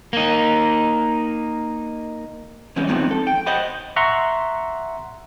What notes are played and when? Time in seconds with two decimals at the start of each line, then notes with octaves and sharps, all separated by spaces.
0.13 A#3 D#4
2.76 E3 G#3 C4 C#4
2.88 E2 G#2 D#3 F3 B3 C4
3.11 A4
3.27 G5
3.46 C5 D#5 F#5 B5
3.96 E5 F#5 A#5 C6 C#6 F#6